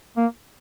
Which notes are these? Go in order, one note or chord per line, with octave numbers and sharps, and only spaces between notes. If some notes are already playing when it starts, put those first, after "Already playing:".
A#3